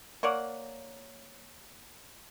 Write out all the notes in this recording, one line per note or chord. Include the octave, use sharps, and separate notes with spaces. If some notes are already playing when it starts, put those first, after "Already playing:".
A#3 C#5 D5 F#5